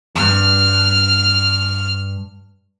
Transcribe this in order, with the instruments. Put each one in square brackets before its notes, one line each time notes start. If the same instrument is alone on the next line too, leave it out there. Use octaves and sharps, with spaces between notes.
[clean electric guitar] E2 G2 [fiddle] F6